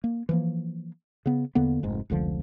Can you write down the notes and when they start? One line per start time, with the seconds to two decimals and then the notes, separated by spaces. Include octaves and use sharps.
0.04 A#3
0.29 E3 F3 A#3
1.26 C#3 B3
1.55 E2 D3 A#3 B3
1.83 F1 G#2
2.10 F1 C#2 D3 F3